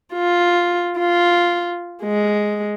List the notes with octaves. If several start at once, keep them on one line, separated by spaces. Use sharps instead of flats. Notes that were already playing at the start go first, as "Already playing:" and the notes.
F4
F4
G#3